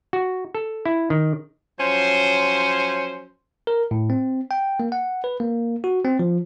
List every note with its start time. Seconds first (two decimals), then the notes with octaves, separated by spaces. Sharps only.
0.13 F#4
0.55 A4
0.86 E4
1.10 D#3
1.79 F3 F#3 C#4 C5
3.67 A#4
3.91 A2
4.10 C4
4.51 G5
4.80 A#3
4.92 F#5
5.24 B4
5.40 A#3
5.84 F#4
6.04 C4
6.19 F3